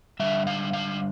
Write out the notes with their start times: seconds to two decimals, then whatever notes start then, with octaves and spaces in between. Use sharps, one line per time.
0.20 D3 G3 E5
0.47 F5
0.73 F5